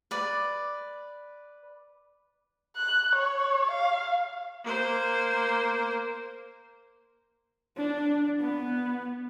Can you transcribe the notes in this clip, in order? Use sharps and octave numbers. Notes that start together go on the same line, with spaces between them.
B4 D5
F#6
C#5
F5
A#3 C5
D4
B3